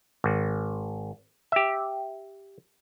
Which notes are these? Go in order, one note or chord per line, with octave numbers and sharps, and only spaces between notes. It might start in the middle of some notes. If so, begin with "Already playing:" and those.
G#1
G4 E5